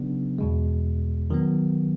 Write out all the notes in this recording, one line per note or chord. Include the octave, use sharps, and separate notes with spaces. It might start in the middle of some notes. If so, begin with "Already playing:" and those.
Already playing: C#3 F#3 B3 D4
E2 B2 G#3
D#3 F#3 B3